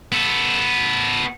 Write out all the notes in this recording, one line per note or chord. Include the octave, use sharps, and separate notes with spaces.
B3 A4